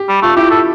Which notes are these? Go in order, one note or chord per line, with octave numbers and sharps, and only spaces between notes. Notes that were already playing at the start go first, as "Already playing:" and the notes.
Already playing: G4
G3
A3 F4
E4 G4
A4